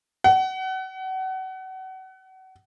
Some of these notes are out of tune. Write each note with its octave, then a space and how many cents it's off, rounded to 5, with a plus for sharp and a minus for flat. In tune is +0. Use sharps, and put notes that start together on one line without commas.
F#5 +30